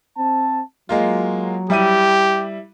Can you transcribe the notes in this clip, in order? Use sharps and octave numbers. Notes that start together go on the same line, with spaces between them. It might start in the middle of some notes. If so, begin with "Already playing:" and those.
C4 A5
F#3 G#3 A#3 F4
G3 E4 G4 D#7